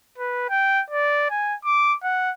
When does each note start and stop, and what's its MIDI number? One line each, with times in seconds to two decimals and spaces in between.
0.19 0.45 71
0.50 0.82 79
0.90 1.29 74
1.31 1.55 80
1.65 1.95 86
2.03 2.31 78